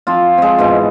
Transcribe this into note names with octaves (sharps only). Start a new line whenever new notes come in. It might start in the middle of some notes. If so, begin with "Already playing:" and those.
F3 C4 F4
G#3 C4
G#2 B2 E3